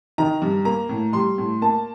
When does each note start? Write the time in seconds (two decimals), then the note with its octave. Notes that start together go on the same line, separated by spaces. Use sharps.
0.18 D#3 A#5
0.42 G2
0.65 A#3 A#5
0.89 A2
1.13 G3 C6
1.38 A2
1.62 A#3 A5